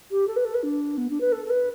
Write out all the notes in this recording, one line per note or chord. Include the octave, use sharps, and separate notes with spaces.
G4
A4
B4
A4
B4
D4
B3
D4
B4
A4
A4
B4